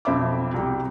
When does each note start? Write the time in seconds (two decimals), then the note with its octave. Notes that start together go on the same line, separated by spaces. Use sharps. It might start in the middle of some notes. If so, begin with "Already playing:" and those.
0.05 B1 F2 C5 E5 B5 D6
0.54 C2 G3 G4